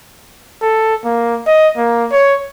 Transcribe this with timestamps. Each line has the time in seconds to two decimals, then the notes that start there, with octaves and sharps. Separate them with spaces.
0.62 A4
1.05 A#3
1.47 D#5
1.77 A#3
2.12 C#5